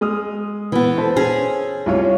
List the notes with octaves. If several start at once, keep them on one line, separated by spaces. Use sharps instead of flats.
G#3 D#6 F6
E3 B3
A4 C5
C#4 G#4
C2 F4 C#5